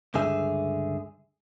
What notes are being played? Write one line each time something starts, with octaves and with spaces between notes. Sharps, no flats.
C#2 G2 D3 G#4 E5